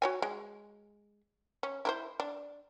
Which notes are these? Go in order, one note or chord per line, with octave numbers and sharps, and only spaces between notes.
F#4 C#5 G#5
G#3
C#4
E4 A#4 C5
D4